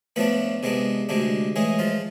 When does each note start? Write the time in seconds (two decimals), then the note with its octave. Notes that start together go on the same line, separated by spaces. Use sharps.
0.16 A2 F3 A3 B3 D4 B4
0.63 C3 G#3 B3 D4
1.09 D2 C3 G#3 D4
1.56 A2 E3 G#3 G#4
1.79 F3 F4